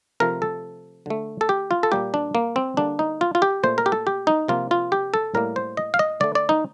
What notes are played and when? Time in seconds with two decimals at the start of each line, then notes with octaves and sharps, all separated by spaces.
0.20 C3 F3 A3 A#4
0.42 A4
1.06 D3 A3
1.41 A4
1.49 G4
1.71 F4
1.83 A4
1.92 A#2 G3 A#3 G4
2.14 D4
2.35 A#3
2.56 C4
2.77 D3 G3 A#3 D4
2.99 D#4
3.21 F4
3.35 F4
3.42 G4
3.63 A#2 A3 C5
3.78 A#4
3.86 G4
3.92 A4
4.07 G4
4.27 D#4
4.48 C3 F3 A#3 F4
4.71 F4
4.92 G4
5.14 A4
5.35 A2 G3 A#3 A#4
5.56 C5
5.77 D#5
5.94 F5
5.99 D#5
6.20 D3 A3 D5
6.35 D5
6.49 D#4